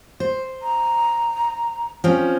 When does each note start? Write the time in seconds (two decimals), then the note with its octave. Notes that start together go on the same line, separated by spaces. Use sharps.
0.20 C5
0.62 A#5
2.04 F3 C4 C#4